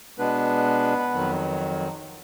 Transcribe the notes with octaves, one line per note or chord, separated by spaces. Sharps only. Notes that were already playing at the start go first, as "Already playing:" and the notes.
B2 G#3 B3 D4 B4
F2 D#3 F#3